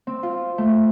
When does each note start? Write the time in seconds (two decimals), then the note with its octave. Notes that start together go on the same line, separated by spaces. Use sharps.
0.07 C4
0.23 F4
0.58 A3